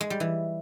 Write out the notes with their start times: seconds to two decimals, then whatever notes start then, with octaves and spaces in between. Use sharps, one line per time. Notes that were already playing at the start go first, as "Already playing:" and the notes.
0.01 G#3
0.10 G3
0.20 E3